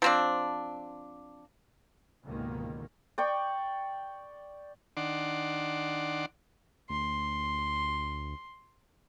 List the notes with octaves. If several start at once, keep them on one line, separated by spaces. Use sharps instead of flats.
F3 C4 D4
C#2 G#2 B2 D3 D#3 A#3
D5 G5 C#6
D#3 D4 F#5 C6 D6
D2 C6